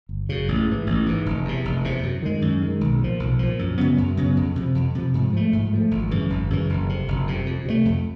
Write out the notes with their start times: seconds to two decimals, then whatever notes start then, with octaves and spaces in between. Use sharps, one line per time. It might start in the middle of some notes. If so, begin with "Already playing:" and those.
0.09 G1
0.29 F#2 C#3
0.48 A1
0.67 G#2 E3
0.87 A1
1.06 G#2 E3
1.26 F1
1.45 E2 C3
1.65 F1
1.84 E2 C3
2.03 F#2
2.23 D#3 G#3
2.42 F#2
2.62 D#3 G#3
2.81 B1
3.00 A#2 F3
3.20 B1
3.39 A#2 F3
3.59 F#2
3.78 C#3 F#3 B3
3.98 F#2
4.17 C#3 F#3 B3
4.36 F2
4.56 C3 F3
4.75 F2
4.95 C3 F3
5.14 G#2
5.33 F3 A3
5.53 G#2
5.73 F3 A3
5.91 G#1
6.11 F#2 C#3 E3
6.30 G#1
6.50 F#2 C#3 E3
6.70 F#1
6.89 F2 C3
7.08 F#1
7.27 F2 C3
7.46 F2
7.66 C3 F3 A3
7.85 F2